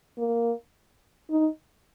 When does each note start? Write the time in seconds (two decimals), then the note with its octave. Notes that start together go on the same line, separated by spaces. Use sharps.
0.18 A#3
1.30 D#4